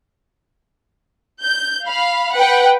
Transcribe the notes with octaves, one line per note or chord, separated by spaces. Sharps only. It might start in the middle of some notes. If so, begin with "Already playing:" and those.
G6
F5 B5
B4 F#5 G5